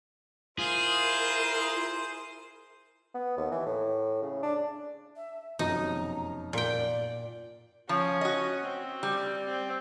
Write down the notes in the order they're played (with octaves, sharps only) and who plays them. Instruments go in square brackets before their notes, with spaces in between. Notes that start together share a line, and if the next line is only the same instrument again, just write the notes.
[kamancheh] E4 A#4 [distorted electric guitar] F4 [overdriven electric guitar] G#4 [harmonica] C5
[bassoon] B3
D#2
E3
A2
C#3
D4
[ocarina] E5
[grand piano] F1 F#2 B2 [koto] D#4 [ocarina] A#5
[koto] A#2 G5 [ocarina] D5
[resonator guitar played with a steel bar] F3 [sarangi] C#4
[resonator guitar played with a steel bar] F#4 D#5
[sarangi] C4
[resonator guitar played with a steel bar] G3
[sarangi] C4